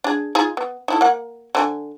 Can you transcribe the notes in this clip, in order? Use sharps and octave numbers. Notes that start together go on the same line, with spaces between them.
D4 G#4
D#4 F4 G#4
B3
D#4 E4 A4
A#3 F#5
D3 C4 G#5